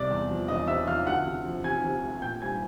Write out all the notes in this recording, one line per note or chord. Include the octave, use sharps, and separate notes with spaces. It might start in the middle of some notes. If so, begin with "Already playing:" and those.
Already playing: C2 C3 D5 D6
E2
F3
E1 D#5 D#6
C3 E5 E6
F3 F5 F6
D2 F#5 F#6
C3
F3
C3 G#5 G#6
C3
A3
A#2 G5 G6
G3 G#5 G#6